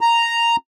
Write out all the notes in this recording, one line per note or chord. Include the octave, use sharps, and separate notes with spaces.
A#5